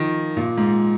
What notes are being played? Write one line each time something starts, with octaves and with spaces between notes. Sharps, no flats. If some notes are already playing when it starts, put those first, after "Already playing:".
Already playing: D#3 F3
A#2
G#2